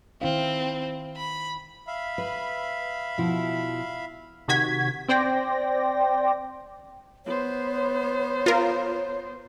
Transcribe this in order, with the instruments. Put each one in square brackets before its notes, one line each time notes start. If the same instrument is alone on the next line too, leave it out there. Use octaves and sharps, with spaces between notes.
[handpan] D#3 E4 F5 [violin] C4
[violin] B5
[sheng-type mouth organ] E5 F5 B5
[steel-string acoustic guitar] B4
B2 F3 E4
[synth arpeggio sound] C3 D#3 F#4 G#6 B6
C4 C5 D5 G5 A#6
[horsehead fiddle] B3 C5 [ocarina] C#5
[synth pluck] F4 A#4